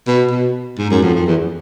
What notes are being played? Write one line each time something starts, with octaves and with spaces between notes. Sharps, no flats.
B2
B2
G#2
F#2
F2
F2
E2